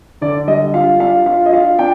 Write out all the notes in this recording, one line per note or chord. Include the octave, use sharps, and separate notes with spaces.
D3 D5
G3 D#5
F4 F5
D4 F5
F4 F5
D#5
F4 F5
D4 G5